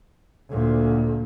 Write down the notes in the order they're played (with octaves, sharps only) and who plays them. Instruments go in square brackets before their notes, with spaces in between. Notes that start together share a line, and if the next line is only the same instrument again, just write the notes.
[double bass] D2 A#2